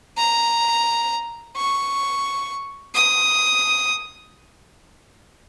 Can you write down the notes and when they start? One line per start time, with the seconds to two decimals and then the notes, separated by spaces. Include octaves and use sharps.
0.18 A#5
1.57 C#6
2.95 D#6